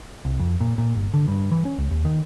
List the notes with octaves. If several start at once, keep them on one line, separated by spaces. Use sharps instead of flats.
C2
F2
A#2
A#2
G1
D3
G2
E3
C#4
C#2
D#2
D#3